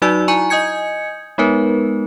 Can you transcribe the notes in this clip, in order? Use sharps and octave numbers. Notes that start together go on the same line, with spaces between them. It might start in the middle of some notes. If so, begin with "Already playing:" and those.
F#3 D#4 F#4 D5 E6
E4 G#5 A#5 C#6
D#5 G#5 D#6 G6 G#6 C#7
G#3 B3 D#4 A#4 B4